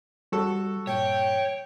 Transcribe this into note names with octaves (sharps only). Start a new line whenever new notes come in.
G3 F#4 A4
G2 A#2 C#5 G5